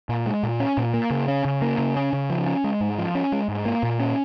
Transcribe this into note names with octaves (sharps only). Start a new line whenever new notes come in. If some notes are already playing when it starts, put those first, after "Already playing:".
A#2
G#3
A#2
C#4
A#2
A#3
C#3
C#4
C#3
A#3
C#3
C#4
C#3
F3
C#4
G#3
G#2
F3
C#4
G#3
G#2
A#3
A#2
C#4